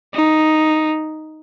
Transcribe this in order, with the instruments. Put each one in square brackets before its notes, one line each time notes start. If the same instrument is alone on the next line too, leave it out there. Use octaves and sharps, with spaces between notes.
[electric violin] D#4